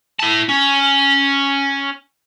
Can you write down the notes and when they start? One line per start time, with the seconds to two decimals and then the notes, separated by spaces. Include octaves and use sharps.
0.20 E4 A5
0.50 C#4